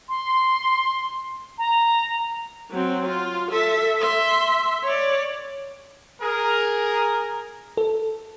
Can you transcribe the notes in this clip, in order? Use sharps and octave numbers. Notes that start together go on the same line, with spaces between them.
C6
A#5
F#3 C4
F4
A4 E5
E5 C6
C#5 D5
G#4 A#4
A4